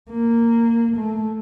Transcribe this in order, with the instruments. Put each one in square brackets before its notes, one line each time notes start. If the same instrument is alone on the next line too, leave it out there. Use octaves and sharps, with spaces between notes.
[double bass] A#3
A3